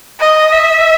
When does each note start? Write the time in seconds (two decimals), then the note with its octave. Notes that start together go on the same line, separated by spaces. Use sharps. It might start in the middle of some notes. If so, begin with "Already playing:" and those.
0.20 D#5
0.52 E5